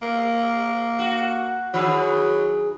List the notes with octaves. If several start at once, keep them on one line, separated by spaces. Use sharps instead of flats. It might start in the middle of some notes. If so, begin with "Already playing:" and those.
A#3
F#4
D#3 F#3 E4 G#4